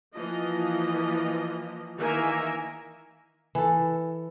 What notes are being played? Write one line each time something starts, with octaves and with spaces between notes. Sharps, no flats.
E3 F3 A#3 F4 D#5
D#3 E3 A#3 A#4 E5 G#5
E3 A4